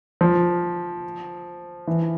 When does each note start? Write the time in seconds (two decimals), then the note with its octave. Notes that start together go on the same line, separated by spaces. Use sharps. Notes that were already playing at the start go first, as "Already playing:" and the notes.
0.21 F3
1.87 E3